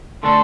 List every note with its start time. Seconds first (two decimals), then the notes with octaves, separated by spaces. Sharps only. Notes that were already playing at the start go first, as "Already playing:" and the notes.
0.23 D3 A3 D4 A4 C6